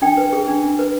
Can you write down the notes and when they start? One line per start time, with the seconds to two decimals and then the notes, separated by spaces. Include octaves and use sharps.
0.02 D4 G5
0.17 B4
0.33 G#4
0.48 D4
0.63 D4
0.79 B4